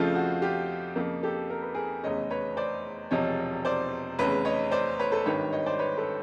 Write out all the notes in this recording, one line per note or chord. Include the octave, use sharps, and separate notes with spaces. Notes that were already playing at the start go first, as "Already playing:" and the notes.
Already playing: F2 C#3 F3 A3 C4 F4
F#4
F4 G4
F2 C#3 F3 A#3
G4 A4
A#4
B4
G#4 A#4
F1 E2 C#3 C#5 D#5
B4 C#5
C5 D5
E1 E2 C3 F3 C#5 D#5
C5 D5
F1 E2 C#3 B4 C#5
C#5 D#5
C5 D5
B4 C#5
A4 B4
G#1 G2 D#3 B4 C#5
C#5 D#5
C5 D5
B4 C#5
A4 B4